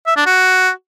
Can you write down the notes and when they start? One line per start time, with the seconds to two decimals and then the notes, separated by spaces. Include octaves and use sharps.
0.07 E5
0.17 D4
0.26 F#4